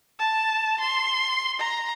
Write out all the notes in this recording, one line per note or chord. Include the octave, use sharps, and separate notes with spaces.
A5
C6
A#5